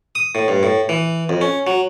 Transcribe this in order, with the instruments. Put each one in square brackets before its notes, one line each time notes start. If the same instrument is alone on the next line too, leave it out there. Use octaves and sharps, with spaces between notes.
[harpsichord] D#6
A2
G2
A2
E3
F2
C#4
F#3